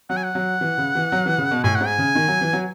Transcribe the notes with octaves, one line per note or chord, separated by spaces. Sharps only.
F#3 F#5
G#5
F#5
F#3
E3
C#3
E3
F#3
E3
C#3
B2
A2 G#5
F#5
G#2
G#5
C#3
D#3
F#3
E3
F#3